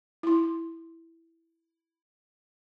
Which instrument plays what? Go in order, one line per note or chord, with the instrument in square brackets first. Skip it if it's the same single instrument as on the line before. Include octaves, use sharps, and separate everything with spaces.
[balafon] E4 C6